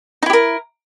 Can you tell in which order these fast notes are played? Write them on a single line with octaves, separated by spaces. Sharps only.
D#4 E4 G4 A#4